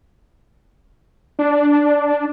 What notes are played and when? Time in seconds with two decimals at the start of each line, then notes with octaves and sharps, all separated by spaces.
1.39 D4